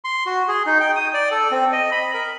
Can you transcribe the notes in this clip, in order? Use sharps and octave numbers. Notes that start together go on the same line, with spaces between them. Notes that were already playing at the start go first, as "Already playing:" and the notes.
C6
F#4
G#4
D#4
G5
D#6
D5
A4
C4
D#5
B5
A#4